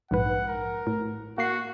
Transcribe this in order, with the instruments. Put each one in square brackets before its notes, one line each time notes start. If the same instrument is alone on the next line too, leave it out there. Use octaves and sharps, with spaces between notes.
[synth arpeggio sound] A#1 G#2 B4 [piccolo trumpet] F#5
[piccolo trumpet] A#4
[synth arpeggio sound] A2
[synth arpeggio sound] A#3 C7 [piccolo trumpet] F#4